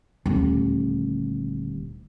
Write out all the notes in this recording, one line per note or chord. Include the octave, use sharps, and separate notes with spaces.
D#1 D2